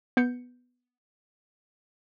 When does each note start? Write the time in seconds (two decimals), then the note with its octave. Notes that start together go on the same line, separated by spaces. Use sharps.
0.17 B3 G6 C#7